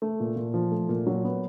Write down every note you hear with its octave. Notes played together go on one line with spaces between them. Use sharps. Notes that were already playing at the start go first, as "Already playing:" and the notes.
A3
A#2
A#2
F3
A3
A#2
F#3
B3